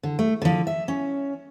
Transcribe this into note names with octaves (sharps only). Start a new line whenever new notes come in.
D3
A3
D3 F3
E5
C#4